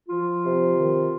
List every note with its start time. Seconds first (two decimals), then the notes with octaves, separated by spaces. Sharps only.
0.09 F3 F4
0.43 C3
0.76 D#3